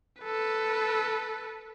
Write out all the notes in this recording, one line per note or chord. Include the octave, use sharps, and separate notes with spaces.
A4 B4